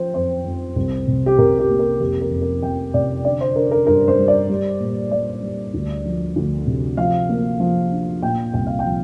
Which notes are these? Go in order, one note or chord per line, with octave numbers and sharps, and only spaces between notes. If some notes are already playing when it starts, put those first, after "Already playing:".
Already playing: F3 F4 C5 G5
F2 C5
F2
C2
C3
G4
C3 A#4
G4
A#3
A#4
F1 G4
A#4
F2
A#4
F1 G5
C3 D5
D3 D5
C5
D4 A#4
A#4
G2 A#4
C5
G3
D5
G3
A#2
G3 D5
G3
D2
F3
D2
C3
F3 F5
A#3
F3
D4
A#2 G5
C2 G5
F5
G5
F3